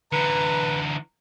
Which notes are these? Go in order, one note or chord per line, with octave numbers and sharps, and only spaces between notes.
D3 E3 B4 A#5